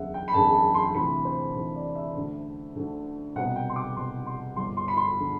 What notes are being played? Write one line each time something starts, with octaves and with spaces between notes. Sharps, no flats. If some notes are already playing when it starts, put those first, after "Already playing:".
Already playing: F#1 E2 D3 E5 F#5
G5
B5
F#1 E2 D3 A5
A5
C6
D2 C3 E3 B5
C5
D2 C3 E3
D5
E5
D2 D3
D2 D3
C2 B2 F#5
G5
C6
D6
C2 B2 C6
C6
G1 G2 D3 C6
C6
B5
C6
D3